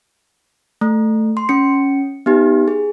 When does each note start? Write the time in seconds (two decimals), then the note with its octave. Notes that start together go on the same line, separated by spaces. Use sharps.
0.81 A3
1.37 C6
1.49 C#4 C#7
2.26 B3 D#4 G4
2.68 G#4